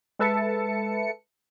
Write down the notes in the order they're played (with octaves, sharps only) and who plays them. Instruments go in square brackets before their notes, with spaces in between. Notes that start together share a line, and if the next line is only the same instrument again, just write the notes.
[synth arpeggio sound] G#3 A4 B4 E5 A5 C#7